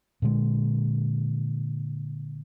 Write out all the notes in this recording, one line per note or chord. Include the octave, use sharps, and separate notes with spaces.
A#2 D3 G#3